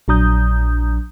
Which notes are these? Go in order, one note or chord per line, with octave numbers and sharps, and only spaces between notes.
A#1 F#3 D4 A#5 D#6 G6